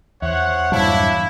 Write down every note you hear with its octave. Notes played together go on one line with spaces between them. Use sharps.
E2 C5 C#5 E5 F#5
G2 A#2 F#3 D4 E4 C#5 F5 A5